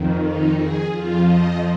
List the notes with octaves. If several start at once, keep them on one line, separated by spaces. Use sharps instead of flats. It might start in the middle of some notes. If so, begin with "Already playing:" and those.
Already playing: F2 D#3
D#4
G#4
F2 F3 F4
D#5